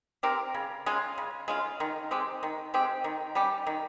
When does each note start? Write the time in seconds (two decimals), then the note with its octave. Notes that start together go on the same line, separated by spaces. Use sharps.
0.23 C4 G4 A#4
0.55 C#3
0.86 G#3 C#4 F4
1.18 C#3
1.48 G#3 C#4 F4
1.80 D#3
2.11 G#3 C4 G4
2.43 D#3
2.74 G#3 C4 G4
3.04 D#3
3.35 G3 C#4 G4
3.67 D#3